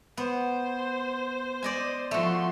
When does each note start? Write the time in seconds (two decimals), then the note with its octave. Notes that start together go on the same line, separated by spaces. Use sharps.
0.17 B3 C5
1.63 D5 D#5 G#5
2.11 F3 A3 F#4 C6